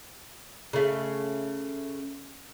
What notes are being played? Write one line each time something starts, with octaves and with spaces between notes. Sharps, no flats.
C#3 A3